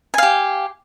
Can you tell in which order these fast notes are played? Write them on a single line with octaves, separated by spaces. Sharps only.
G#5 F5 G4